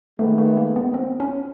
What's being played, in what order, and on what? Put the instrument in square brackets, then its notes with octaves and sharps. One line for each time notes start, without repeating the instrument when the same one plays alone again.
[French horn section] D#3 G#3 B3 [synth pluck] A3
[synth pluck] A3
A#3
B3
C4
C#4